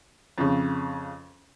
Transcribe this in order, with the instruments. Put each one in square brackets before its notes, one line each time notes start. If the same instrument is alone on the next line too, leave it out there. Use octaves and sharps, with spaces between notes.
[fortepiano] F2 C#3